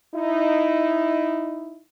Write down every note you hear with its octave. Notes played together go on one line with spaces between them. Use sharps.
D#4 E4